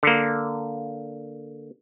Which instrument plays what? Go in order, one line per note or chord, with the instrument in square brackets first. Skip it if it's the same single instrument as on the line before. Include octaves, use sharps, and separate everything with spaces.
[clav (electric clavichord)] D3 A#3